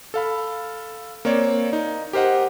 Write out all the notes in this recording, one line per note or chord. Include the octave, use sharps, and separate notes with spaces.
A4 F5 B5
A#3 C4 C#5 D5
D#4
G4 A#4 C5 D#5 F#5